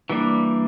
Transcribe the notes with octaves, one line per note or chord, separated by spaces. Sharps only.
E3 G3 A#3 D4